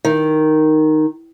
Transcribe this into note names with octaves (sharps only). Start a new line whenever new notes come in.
D#3